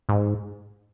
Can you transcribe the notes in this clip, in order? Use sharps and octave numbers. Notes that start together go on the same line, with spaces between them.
G#2